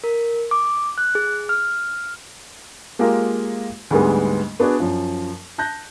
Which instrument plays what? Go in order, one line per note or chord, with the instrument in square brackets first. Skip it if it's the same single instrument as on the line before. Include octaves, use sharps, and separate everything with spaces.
[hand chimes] A#4
D6
F#6
G#4
F6
[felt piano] G#3 A#3 F4 G4 A#4
D2 G#2 G3 G#3 B3
B3 D4 F#4 G#4 D5
F#2 F3
A5 F#6 G6 A#6